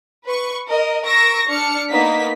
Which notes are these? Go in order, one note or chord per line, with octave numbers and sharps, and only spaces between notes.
B4 C#6
A#4 D#5
A#4 C#6 E6 A#6 D7
D4 F6 C#7
A#3 B3 D#4 B6